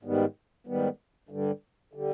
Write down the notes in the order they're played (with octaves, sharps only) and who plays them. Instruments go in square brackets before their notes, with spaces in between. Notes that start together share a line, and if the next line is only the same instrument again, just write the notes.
[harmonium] G#2 D#3 G3 B3
G#2 D#3 G3 B3
G2 D3 G3
D3 G3